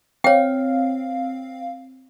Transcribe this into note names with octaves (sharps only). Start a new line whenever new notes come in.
C4 C#5 F5 G5